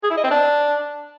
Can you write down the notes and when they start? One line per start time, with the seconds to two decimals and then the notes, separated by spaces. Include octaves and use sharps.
0.03 G#4
0.10 E4
0.17 D#5
0.24 C4
0.31 D4